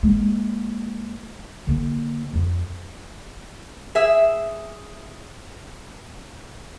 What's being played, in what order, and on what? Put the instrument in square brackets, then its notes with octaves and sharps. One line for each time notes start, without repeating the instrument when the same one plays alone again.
[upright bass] G#3 A#3
D3 A#3
F2
[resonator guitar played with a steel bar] G#4 E5